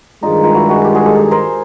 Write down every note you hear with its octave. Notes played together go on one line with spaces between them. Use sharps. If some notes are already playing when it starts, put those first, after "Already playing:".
G2 D#3 G#3 D#4 F4
D#4 F4
E4 F#4
F#4 G#4
F4 G4
F#4 G#4
G4 A4
G#4 A#4
A#4 C5